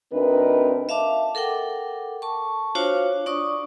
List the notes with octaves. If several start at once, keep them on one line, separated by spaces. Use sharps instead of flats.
D2 C4 D4 D#4 A#4 B4
E5 F5 A5 D6
A4 A#4 F#5 G5 D6
A5 C#6
D4 F4 F#4 C5 C#5 F5
D4 D5 C#6 D#6